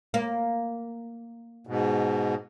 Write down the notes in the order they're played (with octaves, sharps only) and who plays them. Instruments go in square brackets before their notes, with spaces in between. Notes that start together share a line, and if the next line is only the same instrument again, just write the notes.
[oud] A#3
[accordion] G#2 B2